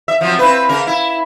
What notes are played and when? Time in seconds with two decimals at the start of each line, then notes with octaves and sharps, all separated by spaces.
0.08 E5
0.21 F3 F#3 C4
0.39 C4 E4 B4
0.69 C#3 A#4
0.87 E4